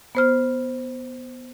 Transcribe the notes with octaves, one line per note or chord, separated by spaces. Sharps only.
B3 C5 F6